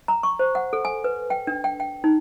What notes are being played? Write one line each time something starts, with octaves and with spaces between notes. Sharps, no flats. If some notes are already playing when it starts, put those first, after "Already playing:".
A#5
C#6
C5
F#5
A4
G#5
B4
G5
D4
G5
G5
D#4